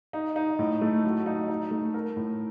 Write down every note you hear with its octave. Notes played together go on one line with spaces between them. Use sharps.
D#4
D#4
A2
A3
F#3
D#4
D#4
A3
A#4
A2